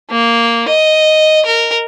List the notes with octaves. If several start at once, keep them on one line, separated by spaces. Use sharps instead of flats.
A#3
D#5
A#4